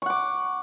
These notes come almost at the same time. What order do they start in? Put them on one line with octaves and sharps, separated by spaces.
C#6 F#5 D6